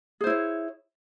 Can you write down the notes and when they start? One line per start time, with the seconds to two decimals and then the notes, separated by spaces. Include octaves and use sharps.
0.21 G#4
0.24 C5
0.27 E4
0.30 C#5